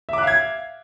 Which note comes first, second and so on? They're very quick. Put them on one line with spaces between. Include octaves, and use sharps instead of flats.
E5 D6 F#6 F5 G#6